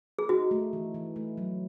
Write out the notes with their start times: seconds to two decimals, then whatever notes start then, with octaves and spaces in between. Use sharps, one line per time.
0.19 G#4
0.29 D#4 F#4
0.51 A3
0.73 E3
0.94 E3
1.16 A3
1.38 F#3